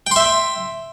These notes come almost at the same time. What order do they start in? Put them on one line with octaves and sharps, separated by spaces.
G5 C6 E5